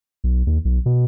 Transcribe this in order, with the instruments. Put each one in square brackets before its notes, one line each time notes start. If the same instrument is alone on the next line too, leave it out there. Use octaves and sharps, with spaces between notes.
[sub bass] B1
D#2
B1
B2